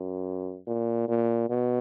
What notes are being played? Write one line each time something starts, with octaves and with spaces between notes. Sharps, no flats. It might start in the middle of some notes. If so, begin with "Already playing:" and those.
Already playing: F#2
A#2
A#2
B2